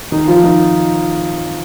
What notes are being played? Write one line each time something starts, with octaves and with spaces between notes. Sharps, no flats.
D#3 D#4
F3 F4
D#3 D#4